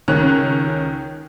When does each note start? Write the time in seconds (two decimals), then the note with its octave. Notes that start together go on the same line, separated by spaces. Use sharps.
0.08 C#2 D#3 C#4 F#6